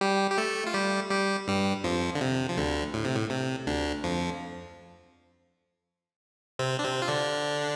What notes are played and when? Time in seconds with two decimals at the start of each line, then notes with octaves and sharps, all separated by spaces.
0.01 G3 G4
0.30 G4
0.38 A3 A4
0.67 F4
0.74 G3 G4
1.11 G3 G4
1.48 G2 G3
1.84 F2 F3
2.15 D3
2.21 C3
2.49 F3
2.57 D2 D3
2.94 A2
3.05 C3
3.15 A2
3.30 C3
3.67 D2 D3
4.03 F2 F3
6.59 C3 C4
6.79 D4
6.84 C3 C4
7.02 F4
7.08 D3 D4